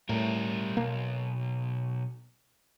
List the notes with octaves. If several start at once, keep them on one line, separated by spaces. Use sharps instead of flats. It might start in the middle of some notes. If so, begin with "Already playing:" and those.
A2 G3 A#4
B1 A#3